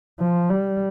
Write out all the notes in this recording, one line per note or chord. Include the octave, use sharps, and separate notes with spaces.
F3
G3